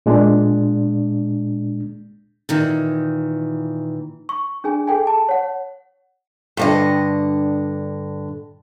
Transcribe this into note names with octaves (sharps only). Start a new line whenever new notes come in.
A#2 G#3 D4
A#2 D#3 E3
C#6
D4 G#4 G#5
G#4 A4 G5 G#5
A5
C#5 F#5
G2 D3 D#5